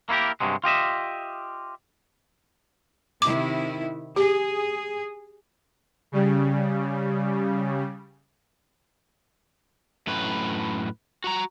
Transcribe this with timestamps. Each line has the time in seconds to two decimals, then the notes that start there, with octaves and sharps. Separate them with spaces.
0.09 A#3 E4 F#4 G4 A#4
0.40 G2 C3 F#3 G#3
0.64 F4 G4 D#5 E5
3.22 C3 D#3 E4 D6
4.16 G4 G#4
6.12 C#3 G3
10.07 F#2 A2 B4
11.24 F#4 A#5